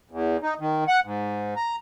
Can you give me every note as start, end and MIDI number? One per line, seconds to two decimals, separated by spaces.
0.11 0.37 40
0.43 0.54 63
0.60 0.84 51
0.88 1.00 78
1.05 1.54 44
1.56 1.76 82